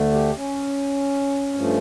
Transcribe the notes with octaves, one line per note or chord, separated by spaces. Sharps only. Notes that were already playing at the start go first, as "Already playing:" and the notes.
Already playing: D2 D3 A3
G4
C#4
G2 F3 A3